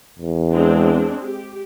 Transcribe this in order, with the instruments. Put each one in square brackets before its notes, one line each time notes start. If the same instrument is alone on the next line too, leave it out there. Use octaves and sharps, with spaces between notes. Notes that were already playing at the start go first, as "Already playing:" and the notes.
[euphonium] E2
[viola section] G#3 C4 D4
G4